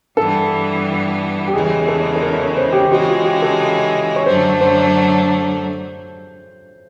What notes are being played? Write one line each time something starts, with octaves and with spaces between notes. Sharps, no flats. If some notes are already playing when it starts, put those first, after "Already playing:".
G2 E3 G3 B3 A4
G4
E2 C#3 E3 G#3 G#4
A4
A4
A#4
C#5
C5
G4
C#3 E3 G#3 F#4
F4
G4
A4
C#5
F#2 D3 F#3 A3 C5
C5